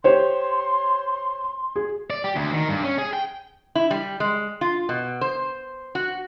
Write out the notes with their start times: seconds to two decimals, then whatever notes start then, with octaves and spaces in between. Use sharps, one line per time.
0.04 G4 C5 C#5 C6
1.76 G#4
2.10 D5
2.24 G4
2.36 D2
2.53 D#3
2.69 G2
2.84 C#4
2.98 G#4
3.13 G5
3.75 E4
3.91 G3
4.20 G#3
4.61 F4
4.89 B2
5.21 C5
5.95 F#4